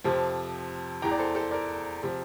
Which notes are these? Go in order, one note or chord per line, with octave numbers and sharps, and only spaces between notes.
F2 C3 F3
E2 E3 G5 A#5
D5
A4 C5
A4 C5
A#4 D5
C3 F3